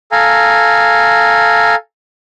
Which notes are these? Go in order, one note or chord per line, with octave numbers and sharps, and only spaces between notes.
A4 F5 G#5 A#5